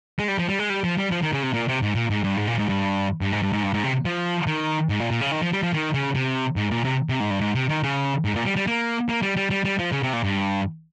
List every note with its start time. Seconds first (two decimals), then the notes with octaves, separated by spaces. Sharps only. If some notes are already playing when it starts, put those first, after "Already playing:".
0.19 G#3
0.28 G3
0.39 F3
0.49 G3
0.59 G#3
0.70 G3
0.84 F3
0.98 G3
1.11 F3
1.22 D#3
1.33 C#3
1.43 C3
1.54 A#2
1.68 C3
1.82 G#2
1.95 A#2
2.10 G#2
2.24 G2
2.37 G#2
2.48 A#2
2.59 G#2
2.69 G2
3.21 G2
3.32 G#2
3.43 G2
3.53 G#2
3.63 G2
3.74 G#2
3.84 C3
4.05 F3
4.47 D#3
4.89 G#2
5.00 A#2
5.10 A#2
5.21 C#3
5.32 D#3
5.42 F3
5.53 G3
5.63 F3
5.74 D#3
5.94 C#3
6.15 C3
6.56 G#2
6.71 A#2
6.85 C3
7.09 C3
7.20 G#2
7.30 G2
7.41 G#2
7.55 C3
7.69 D#3
7.83 C#3
8.25 G#2
8.36 A#2
8.45 G3
8.56 G3
8.67 A#3
9.09 A#3
9.22 G3
9.37 G3
9.50 G3
9.65 G3
9.79 F3
9.92 C#3
10.03 C3
10.13 A#2
10.24 G2